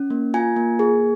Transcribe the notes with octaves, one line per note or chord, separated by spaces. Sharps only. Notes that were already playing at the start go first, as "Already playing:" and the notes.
Already playing: C#4
A#3
F4 G#5
A#3
G#4